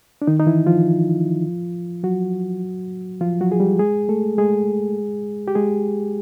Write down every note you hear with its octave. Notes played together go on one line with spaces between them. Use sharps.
D4
D#3 D#4
D#4
E3 E4
F3 F4
F#3 F#4
F3 F4
F#3 F#4
G#4
G3 G4
G#3 G#4
A3 A4
G#3 G#4
G4
G#3 G#4